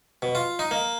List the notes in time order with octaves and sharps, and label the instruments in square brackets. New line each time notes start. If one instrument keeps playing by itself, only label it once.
[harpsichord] B2
F4
D#4
A#3